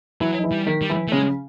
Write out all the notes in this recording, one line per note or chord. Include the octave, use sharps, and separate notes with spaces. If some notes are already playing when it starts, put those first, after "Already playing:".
E3 F#3 E4
D#4
E3 E4
G3
D#3 D#4
G3
E3 E4
A3
C#3 G#3 C#4